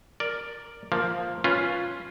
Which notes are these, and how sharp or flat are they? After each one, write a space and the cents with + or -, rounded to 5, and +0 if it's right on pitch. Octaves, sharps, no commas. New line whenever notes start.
A#4 +0 D5 +0
F3 +0 A#3 +0 A#5 -35
C#4 +0 F4 +0 B4 +0